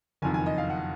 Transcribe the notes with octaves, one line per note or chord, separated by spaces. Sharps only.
F#1 F2 D#3 G#5
G#5
D#5
F5
F#5